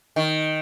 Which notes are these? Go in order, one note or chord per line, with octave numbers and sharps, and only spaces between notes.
D#3